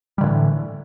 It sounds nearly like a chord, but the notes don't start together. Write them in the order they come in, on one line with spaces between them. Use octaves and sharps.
G3 D3 A2 E3